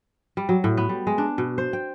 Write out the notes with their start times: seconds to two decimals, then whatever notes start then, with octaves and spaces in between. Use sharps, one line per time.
0.37 G3
0.49 F#3
0.64 A2
0.77 B3
0.89 G3
1.07 G#3
1.18 D4
1.38 B2
1.58 C5
1.73 G5